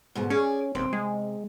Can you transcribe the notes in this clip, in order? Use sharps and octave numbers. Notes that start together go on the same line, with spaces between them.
D2 G#2 B2
C#4 G#4 D5
D#1 C4
C3 G#3